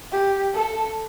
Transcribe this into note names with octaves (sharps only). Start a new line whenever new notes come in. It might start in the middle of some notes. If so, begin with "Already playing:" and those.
G4
A4